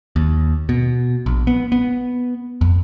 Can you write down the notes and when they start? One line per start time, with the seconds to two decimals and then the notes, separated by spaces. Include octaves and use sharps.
0.16 D#2
0.69 B2
1.26 A#1
1.47 B3
1.72 B3
2.61 F2